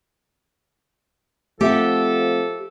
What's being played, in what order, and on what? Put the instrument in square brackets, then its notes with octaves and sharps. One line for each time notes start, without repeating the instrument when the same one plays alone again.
[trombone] F3 [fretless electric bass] A3 C4 [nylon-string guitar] G4 E5 F#5 [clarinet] A4